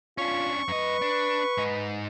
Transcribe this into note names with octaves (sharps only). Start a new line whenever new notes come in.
C#4 D4 F4 C#6
F#2 B4 D#5
D4
G#2 D#4